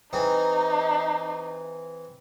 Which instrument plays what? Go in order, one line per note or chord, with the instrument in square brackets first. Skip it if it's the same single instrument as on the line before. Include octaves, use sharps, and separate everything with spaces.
[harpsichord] E3 C4 G#4 [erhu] D#4